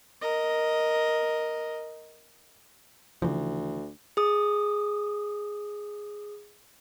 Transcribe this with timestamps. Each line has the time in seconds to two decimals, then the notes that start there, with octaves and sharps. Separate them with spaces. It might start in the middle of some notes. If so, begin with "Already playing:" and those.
0.21 A#4 D#5
3.22 D2 C#3 E3 F3
4.17 G#4 D#6